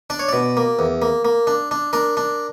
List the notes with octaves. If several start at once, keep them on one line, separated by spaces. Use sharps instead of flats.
D4 D5
C#5
B2 D5
A#3
E2
A#3
A#3
D4
D4
D4 A#4
D4